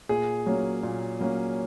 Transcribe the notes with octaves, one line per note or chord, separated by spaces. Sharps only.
A#2 G#4
F#3 A#3 C#4
A#2
F#3 A#3 C#4